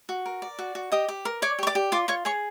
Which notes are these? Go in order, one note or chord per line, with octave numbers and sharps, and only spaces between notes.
F#4
A#4
D5
F#4
F#4
G4 D#5 D#6
G4
A#4
C#5 D5 D6
G4 C#6
D5 D6
G4
F4 D5 D6
F4 C#5 C#6
G#4 C#5 C#6